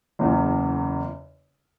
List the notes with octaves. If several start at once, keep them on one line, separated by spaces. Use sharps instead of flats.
F#1 E2 C#3